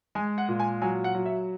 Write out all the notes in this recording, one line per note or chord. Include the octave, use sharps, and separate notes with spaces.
G#3 G#5
F#5
A#2
G#5
F#3 G#5
F#5
F#3
E5